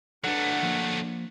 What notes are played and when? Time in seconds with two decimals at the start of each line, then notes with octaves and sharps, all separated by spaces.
0.24 F#3 A3 D4 A4 B4 F#5
0.63 F3 A#3